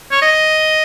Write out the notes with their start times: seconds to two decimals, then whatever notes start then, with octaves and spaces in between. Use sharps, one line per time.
0.11 C#5
0.22 D#5